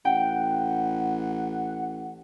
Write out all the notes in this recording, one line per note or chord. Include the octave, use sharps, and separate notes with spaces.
A1 F#5 G5